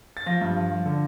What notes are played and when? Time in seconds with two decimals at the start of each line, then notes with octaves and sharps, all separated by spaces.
0.17 A6
0.26 F3 A#6
0.41 G2
0.56 F3
0.71 F3
0.86 D3